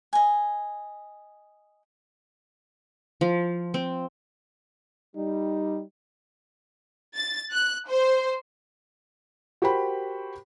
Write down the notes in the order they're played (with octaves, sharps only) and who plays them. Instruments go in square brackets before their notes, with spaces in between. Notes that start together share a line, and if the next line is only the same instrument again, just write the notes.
[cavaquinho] D#5 G#5
[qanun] F3
C4
[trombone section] G3 [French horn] D#4
[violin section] A6
F#6
C5
[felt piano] F#4 G4 A#4 C5 G5 B5